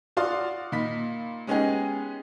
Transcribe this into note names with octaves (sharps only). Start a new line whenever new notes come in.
F4 F#4 D5 F5 C6 D#6
A#2 D#4 B5 B6
G#3 B3 C#4 D#4 G4 G#4